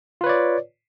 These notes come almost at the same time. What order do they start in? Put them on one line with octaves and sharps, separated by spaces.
F4 B4 C#5 D5